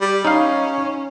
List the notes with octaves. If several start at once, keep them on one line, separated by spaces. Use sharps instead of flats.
G3
C#4 D#4 F5